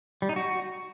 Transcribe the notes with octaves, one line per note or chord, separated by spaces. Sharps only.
G3
D#4
F#4